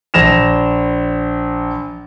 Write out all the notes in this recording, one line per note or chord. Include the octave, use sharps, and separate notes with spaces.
A#1 A#6 E7 F7